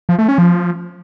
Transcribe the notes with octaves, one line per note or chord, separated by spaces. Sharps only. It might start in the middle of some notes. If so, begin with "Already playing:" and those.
F3
A3
C#4
F3